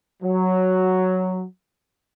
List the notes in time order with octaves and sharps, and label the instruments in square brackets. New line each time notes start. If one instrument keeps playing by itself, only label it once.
[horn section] F#3